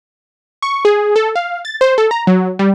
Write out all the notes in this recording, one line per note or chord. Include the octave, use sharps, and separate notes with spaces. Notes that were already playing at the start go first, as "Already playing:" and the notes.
C#6
G#4
A4
F5
A6
C5
A4
A#5
F#3
G3